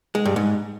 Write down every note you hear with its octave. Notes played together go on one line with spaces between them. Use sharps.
G#3
G2
G#2